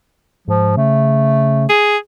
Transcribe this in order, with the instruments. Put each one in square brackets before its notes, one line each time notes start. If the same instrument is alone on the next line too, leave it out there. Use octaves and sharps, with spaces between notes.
[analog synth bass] G#2 [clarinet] F3
[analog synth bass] C#3 [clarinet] A3
[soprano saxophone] G#4